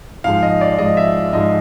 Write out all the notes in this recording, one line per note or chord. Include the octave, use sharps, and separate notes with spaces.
G#2 F3 G#3 F5
D#5
D5
G#2 F3 G#3 D#5
E5
G#2 F3 G#3 D#5